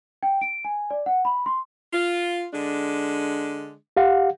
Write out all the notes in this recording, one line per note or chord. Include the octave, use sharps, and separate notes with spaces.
G5
D7
G#5
D5
F#5
B5
C6
F4
D3 G#3 D4
G4 F5 F#5